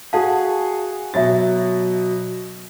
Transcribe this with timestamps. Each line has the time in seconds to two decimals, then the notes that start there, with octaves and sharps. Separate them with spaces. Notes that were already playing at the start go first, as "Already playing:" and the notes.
0.13 F#4 G#4 F5 F#5 A5
1.14 B2 F#3 F#4 E5 A6